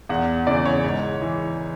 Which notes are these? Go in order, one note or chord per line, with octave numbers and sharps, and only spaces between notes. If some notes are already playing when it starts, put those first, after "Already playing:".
E2 F#5
C#3 E3 D5
C#5
G#2
E3